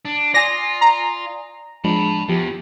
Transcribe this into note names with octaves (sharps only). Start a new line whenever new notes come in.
D4
F4 D5 G#5 D#6 A#6
A#5
F3 G#3 D4 A5 B5
E2 F3 G4